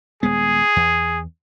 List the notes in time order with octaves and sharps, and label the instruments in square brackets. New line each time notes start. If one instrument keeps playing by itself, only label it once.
[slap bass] D#1 G#3 B3 [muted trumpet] G#4
[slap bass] E2